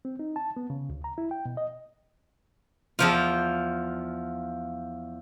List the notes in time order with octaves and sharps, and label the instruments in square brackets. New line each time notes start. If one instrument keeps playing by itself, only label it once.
[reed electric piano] C4
D#4
A5
B3
C#3
D2
A#5
E4
G5
B2
D#5
[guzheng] E2 F3 F4